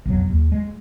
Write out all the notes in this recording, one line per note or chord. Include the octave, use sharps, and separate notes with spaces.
B1 F2 F#3
D#2
G#3